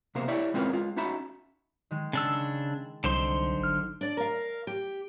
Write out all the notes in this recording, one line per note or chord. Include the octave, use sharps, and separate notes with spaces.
C3 A#3 B3 A#4 C5
E4 G4 C#5 D5 E5
G#3 C4 C#4 F4 A#4 B4
G#3 F4
C#4 D#4 F#4 E5 A5 B5
D#3 G#3
C#3 D4 E6
C2 D3 F#3 D#4 C5 C6
G1 F6
D4 D5
A#4 F5
G4